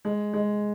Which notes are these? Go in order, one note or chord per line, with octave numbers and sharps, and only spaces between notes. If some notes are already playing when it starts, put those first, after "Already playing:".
G#3
G#3